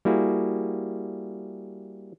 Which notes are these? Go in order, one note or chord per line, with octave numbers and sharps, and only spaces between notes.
G3 A#3 E4 F#4 G#4